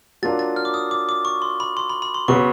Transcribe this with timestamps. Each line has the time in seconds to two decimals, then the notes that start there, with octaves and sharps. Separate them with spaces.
0.23 F#3 A#3 D4 F4 A6
0.39 A6
0.56 F6
0.65 D6
0.74 D#6
0.91 D6
1.09 D6
1.25 C#6
1.42 C6
1.60 B5
1.77 C6
1.90 B5
2.02 B5
2.14 C6
2.28 C#3 F#3 B3 C#6